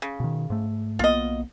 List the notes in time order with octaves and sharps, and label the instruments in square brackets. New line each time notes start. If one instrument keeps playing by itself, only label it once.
[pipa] C#3
[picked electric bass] B2 D#3
G#2 A3
[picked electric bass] B1 A#3 B3 [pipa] F4 D#5